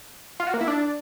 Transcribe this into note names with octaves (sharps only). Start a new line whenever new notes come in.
F4
F#4
A#3
E4
D4